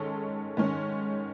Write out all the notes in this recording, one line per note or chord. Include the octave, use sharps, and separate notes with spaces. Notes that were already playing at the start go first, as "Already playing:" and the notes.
Already playing: G#2 D#3 G#3 C#4 A4
G#2 D#3 G#3 C#4